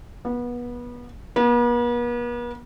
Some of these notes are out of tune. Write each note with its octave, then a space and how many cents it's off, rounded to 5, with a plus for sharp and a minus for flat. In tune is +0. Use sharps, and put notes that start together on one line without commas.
B3 -25
B3 -45